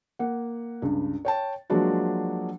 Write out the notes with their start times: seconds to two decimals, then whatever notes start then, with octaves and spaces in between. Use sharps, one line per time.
0.19 A#3 F#5
0.82 C#2 G2
1.25 C#5 G5 A5
1.70 F3 F#3 G#3 A#3 D4 F#4